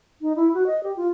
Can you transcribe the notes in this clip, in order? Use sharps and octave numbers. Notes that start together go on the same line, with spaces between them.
D#4
E4
F#4
D#5
G4
F4